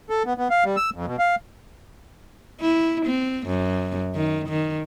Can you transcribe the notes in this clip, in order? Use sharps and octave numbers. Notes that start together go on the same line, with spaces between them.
A4
B3
B3
F5
G3
E6
F2
B2
F5
E4
C4
F#2
D#3
D#3